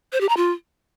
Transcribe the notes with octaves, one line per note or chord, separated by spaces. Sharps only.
C5
G4
A#5
F4